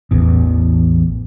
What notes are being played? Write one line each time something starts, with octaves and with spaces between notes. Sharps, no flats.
A1 E2